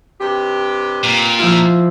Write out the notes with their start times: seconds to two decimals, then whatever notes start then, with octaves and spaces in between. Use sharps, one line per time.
0.21 G2 C3 G4
1.03 A#2
1.39 F3 E4 F4